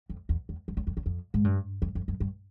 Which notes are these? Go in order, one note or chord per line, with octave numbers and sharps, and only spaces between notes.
F2
E2
E2
F2
E2
F2
E2
F2
G#2
G2
F2
F2
F#2
G2